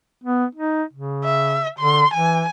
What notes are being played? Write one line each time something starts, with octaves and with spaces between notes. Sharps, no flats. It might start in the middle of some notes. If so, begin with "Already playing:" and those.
B3
D#4
C#3
E5
D3 C6
E3 G#5